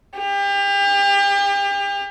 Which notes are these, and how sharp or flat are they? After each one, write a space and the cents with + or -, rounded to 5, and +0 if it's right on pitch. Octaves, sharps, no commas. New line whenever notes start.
G4 +35